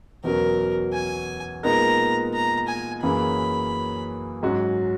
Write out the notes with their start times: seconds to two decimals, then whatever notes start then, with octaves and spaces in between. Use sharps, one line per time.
0.24 E2 B2 F#3 C#4 A#4
0.93 G#5
1.63 A#2 G#3 B3 D#4 A#4 A#5
2.34 A#5
2.67 G#5
3.02 F#2 E3 A#3 C#4 G#4 B5
4.43 G#2 F#3 C#4 F#4